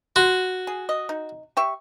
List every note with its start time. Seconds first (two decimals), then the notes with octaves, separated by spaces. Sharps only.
0.16 F#4 C6
0.67 G#4
0.89 D#5
1.09 D#4
1.57 G4 E5 C#6